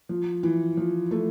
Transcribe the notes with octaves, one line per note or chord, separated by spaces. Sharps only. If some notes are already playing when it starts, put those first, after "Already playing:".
F3
E3
F3
A3